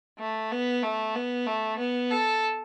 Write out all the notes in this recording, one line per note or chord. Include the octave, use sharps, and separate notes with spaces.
A3
B3
A3
B3
A3
B3
A4